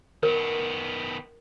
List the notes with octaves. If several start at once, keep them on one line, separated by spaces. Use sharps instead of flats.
D#3 B3 A#4